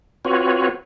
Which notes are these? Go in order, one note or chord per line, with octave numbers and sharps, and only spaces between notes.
C4 F4 F#4 B4 C#5